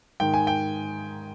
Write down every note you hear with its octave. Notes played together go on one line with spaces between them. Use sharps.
G#2 D#3 G5
G#5
G5